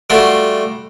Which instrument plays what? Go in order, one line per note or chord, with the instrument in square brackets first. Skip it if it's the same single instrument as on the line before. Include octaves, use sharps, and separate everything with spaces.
[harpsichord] G3 A3 F4 F#4